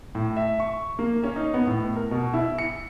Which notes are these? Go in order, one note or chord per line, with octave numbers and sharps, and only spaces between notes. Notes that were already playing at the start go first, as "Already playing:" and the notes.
A2
E5
C#6
A#3
C#4
D#4
B3
A2
A#4
B2
E4
C#7